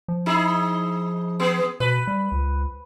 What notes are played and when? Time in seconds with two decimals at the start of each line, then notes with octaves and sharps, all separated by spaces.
0.08 F3
0.26 D#4 E4 G#4
1.40 B3 G#4
1.80 B2 B4
2.07 G3
2.32 C#2